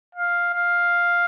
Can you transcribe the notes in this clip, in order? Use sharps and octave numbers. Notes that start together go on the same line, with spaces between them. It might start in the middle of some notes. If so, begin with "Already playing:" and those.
F5
F5